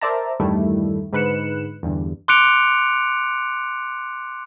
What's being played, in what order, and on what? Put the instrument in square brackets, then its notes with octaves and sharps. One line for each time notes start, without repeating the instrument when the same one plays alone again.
[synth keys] A#4 C5 D5 E5 A5 A#5
E2 G2 D#3 G3 A3 E4
G#2 D3 B4 F#6 C#7 E7
E2 G2 D3
[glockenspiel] C6 D6 F#6 C#7 D7 F7